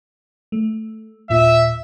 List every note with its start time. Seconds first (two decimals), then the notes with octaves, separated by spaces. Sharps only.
0.52 A3
1.30 D#2 A#2 F4 E5